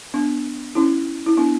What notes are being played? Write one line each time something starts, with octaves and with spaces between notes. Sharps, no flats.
B3 D4
C#4 E4
E4
B3 D4